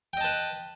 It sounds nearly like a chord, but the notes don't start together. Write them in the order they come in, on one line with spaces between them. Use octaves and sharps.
G5 D#5 A5 B4